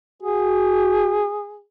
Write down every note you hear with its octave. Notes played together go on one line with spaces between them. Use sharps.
F#4 G#4